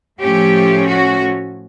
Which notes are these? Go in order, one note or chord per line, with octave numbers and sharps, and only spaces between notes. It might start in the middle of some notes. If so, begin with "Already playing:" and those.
A2 F3 A3 C#4 G4
F#4